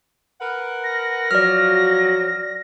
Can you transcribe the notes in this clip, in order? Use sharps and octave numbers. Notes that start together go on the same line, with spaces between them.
A#4 B4 F#5
A#6
F3 F#3 D5 F6